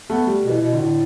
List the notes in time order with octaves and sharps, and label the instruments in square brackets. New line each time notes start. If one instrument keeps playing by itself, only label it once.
[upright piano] A3 [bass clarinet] B3
[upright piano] G3
[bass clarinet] B2
[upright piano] E3
[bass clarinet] B2
[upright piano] D3
[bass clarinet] A2